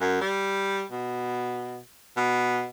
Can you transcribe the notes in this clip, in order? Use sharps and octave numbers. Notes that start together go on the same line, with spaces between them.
F#2
G3
B2
B2